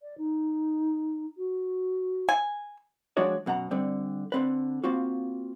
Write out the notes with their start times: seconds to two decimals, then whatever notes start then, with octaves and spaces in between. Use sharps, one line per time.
0.01 D5
0.18 D#4
1.37 F#4
2.29 G#5
3.17 F3 G#3 D4 F#4 C#5 D5
3.46 F#2 B2 F#5 A#5
3.71 D3 G3 C4
4.32 D3 C4 B4
4.84 A#3 C4 F4 F#4